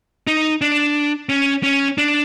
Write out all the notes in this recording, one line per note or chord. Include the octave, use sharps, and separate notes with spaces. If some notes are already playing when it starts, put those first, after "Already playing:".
D#4
D4
C#4
C#4
D4